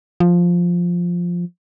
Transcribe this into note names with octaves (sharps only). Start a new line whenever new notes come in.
F3